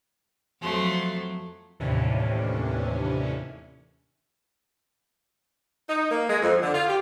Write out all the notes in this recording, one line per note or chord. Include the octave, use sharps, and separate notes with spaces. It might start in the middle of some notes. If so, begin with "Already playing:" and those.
F2 F#3 A3 C6
D#2 A2 C3 E3 C#4 D4
D#4
A#3
G#3
F2
D3
F4
G4